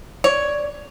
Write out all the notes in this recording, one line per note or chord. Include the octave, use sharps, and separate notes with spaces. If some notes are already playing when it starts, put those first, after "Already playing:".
C#5 D5